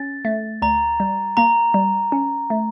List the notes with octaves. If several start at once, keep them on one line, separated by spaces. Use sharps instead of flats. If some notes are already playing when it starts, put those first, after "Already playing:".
Already playing: C#4 A6
A3
D2 A#5
G3
A#3 A#5
G3
C#4
A3